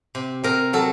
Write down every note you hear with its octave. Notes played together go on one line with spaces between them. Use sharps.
C3
C3 A#4
F#3 A4